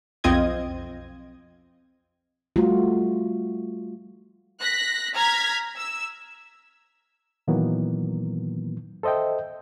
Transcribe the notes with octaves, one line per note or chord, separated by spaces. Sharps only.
B1 F2 C4 F4 D#5 G#6
G3 A3 F4 F#4
F#6 A#6 B6
A#5 F6 G#6 B6
E6
A#2 D#3 E3 F#3 A#3 B3
A4 C5 D#5 E5 G5